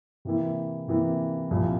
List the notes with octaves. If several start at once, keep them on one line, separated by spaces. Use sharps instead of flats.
C3 E3 A#3 E4
C3 E3 A#3 E4
C2 A#2 F3